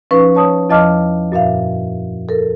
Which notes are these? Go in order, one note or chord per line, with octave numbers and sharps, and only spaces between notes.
F3 C#4 D#4 B4 C#6
C#5 A5 D#6
E2 F3 D#5 A5 D6 F6
F#2 A#2 E5 F5
A4 A#4